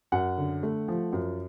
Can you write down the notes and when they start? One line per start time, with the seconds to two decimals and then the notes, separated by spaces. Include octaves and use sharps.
0.12 F#2 F#5
0.38 D3
0.63 A3
0.88 F3
1.13 F#2